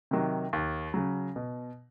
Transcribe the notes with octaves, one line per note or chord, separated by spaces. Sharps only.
C3 D#3 F#3
D#2
C#3 F#3
B2